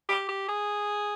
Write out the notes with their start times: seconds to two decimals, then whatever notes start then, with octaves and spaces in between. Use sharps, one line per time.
0.09 G4
0.29 G4
0.49 G#4